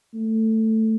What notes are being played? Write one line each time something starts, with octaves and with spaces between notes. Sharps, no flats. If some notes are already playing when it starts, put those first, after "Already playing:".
A3